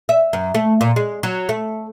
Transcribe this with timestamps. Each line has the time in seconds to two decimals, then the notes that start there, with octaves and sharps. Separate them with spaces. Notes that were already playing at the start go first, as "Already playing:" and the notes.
0.09 E5
0.33 F#2
0.55 A3
0.81 A#2
0.96 G#3
1.23 F#3
1.49 A3